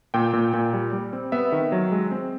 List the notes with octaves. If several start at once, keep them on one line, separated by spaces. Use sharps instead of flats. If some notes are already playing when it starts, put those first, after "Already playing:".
A#2 G5
A#2
A#2
G3
G3
C4
B3 E5
D#3
F#3
G#3
C4